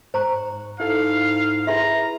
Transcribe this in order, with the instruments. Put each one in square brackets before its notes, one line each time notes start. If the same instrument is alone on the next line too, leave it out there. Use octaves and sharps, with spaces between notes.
[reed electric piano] G#2 C#6 F#6 [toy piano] C5 A#5
[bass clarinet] G#2 [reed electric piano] E4 A4 [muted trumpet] F5
[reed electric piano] E4 G#4 B4 [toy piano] E5 C6 [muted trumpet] A#5